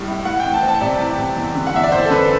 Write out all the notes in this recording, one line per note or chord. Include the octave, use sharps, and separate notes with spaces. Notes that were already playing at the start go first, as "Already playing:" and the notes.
Already playing: A2 G3
E4
A2 F#5
E3 G5
A5
C4
A5
C3 D5
E3
C3
E2
D3
F#5
E2 E5
D5
E2 C5
A4
D3 B4